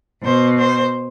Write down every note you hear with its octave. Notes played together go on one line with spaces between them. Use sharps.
B2 C5
C5